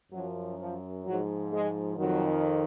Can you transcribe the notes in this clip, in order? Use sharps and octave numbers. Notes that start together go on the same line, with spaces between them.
F#2 F3 F#3
F3
G#2 F3 F#3
G#3
F2 D#3 F#3